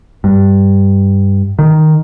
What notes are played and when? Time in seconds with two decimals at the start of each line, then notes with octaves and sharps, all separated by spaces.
0.24 G2
1.59 D#3